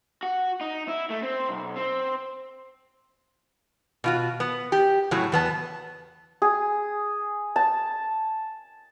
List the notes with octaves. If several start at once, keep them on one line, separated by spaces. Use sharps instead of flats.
F#4
D#4
E4
A3
C4
B1
C4
B2 F4 F#4
B3
G4
A2 C#3 F#3
E2 B3 A5
G#4
A5